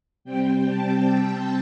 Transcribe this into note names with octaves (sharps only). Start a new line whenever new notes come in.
C3 G3 C4 G5
A5
G5